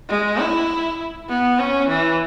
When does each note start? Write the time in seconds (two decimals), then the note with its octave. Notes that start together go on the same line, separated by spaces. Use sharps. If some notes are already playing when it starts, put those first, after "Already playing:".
0.09 G#3
0.39 E4
1.29 B3
1.59 C#4
1.89 E3